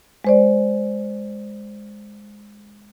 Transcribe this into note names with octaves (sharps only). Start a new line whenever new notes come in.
G#3 C5 D5